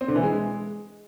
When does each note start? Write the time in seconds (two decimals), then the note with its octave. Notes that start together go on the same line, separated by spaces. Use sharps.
0.01 C4
0.08 D3
0.16 E3
0.23 G#3